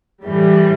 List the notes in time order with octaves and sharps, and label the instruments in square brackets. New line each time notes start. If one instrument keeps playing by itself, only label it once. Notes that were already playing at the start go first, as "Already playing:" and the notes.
[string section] A2 E3 G3